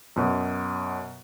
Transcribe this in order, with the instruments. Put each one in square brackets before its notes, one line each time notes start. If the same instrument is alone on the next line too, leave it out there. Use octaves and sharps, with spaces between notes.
[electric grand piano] F#2 B2